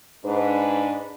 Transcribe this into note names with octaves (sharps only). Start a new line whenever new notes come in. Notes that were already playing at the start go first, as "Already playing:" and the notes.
G#2 D4 B4